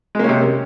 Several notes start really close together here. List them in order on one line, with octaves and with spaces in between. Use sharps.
G#3 A#3 C#4 C3